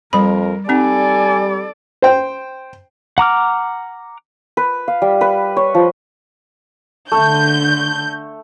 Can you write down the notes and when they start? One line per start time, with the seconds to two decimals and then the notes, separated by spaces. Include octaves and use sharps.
0.13 F2 G3 A#4 B5
0.69 G3 C4 D#4 A4 D5 G#5
2.02 C5 G5
3.18 F#5 A#5 D6 F6
4.57 B4
4.88 F5
5.02 G3
5.21 B4
5.57 C#5
5.75 F3
7.12 D3 A3 G6